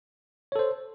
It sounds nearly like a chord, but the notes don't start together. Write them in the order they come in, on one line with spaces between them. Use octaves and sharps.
C#5 A4 C5